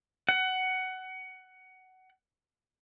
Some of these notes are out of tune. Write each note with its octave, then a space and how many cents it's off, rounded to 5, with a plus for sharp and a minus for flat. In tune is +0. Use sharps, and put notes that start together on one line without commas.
F#5 +15